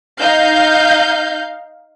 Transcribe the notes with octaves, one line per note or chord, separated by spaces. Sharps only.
D#4 F5 G6